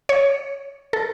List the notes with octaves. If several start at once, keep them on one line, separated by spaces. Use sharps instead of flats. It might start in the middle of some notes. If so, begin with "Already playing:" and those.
C#5
A4